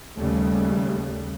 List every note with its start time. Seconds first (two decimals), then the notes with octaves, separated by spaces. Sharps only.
0.18 D#2 C#3 G3 A3